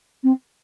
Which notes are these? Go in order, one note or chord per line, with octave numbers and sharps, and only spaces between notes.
C4